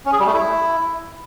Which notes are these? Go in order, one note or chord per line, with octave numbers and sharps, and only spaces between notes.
C#4
G#4
G3
A3
E4